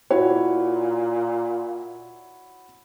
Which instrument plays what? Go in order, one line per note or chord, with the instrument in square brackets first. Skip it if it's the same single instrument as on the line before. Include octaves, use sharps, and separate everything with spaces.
[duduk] A#2 [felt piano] E4 F#4 C#5